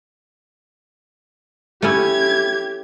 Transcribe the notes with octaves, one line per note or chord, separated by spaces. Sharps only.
A3 C#4 E4 G4 G#6